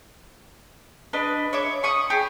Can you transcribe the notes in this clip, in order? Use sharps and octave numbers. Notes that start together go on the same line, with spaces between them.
D4 B4 D#5
C#5 E5 D6
B5 C#6 D#6
G4 G#4